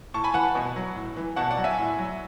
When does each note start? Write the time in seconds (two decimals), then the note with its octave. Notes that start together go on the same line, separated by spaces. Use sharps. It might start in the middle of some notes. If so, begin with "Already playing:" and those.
0.14 A2 A5 C#6
0.24 G#5 B5
0.34 E3 F#5 A5
0.55 B2
0.76 F#3
0.95 A2
1.17 E3
1.36 B2 F#5 A5
1.51 D5 F#5
1.57 F#3
1.64 E5 G#5
1.78 A2
1.98 F#3